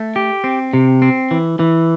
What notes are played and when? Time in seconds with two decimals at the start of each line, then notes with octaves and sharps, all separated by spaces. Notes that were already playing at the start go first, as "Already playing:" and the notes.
Already playing: A3
0.16 G4
0.44 C4
0.73 C3
1.02 C4
1.31 E3
1.59 E3